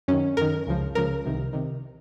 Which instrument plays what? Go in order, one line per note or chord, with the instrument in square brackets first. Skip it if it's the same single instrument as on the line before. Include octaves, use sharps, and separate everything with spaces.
[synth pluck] F#2 D#3 C#4
F#2 D#3 A#4
C#2 C#3 F3
C#2 C#3 F3 A#4
C2 C3 D#3
C3 D#3